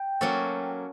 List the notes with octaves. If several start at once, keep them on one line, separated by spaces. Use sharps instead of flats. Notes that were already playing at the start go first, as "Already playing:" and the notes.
Already playing: G5
F#3 A#3 C#4 F#4 A4